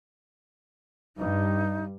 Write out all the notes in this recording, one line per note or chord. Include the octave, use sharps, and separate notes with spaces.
G2 D#4